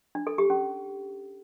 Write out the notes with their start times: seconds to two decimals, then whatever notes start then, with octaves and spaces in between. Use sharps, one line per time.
0.15 D4
0.27 A4
0.38 G4
0.50 C#4